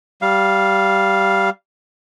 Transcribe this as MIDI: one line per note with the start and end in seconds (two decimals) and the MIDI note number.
0.22 1.50 55
0.22 1.50 77